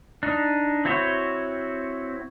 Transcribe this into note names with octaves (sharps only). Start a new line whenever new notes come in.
D4 D#4
C4 E4 F#4 C5 C#5